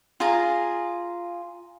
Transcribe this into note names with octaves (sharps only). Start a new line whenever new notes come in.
F4 G#4 A#5